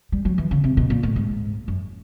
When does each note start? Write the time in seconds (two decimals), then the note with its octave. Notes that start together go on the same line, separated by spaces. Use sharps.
0.12 G3
0.25 F#3
0.38 E3
0.51 C#3
0.64 C3
0.77 B2
0.90 A#2
1.03 A2
1.16 G#2
1.68 F#2